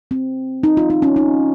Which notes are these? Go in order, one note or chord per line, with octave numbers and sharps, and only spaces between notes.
C4
D#4
F4
D#4
C#4
D#4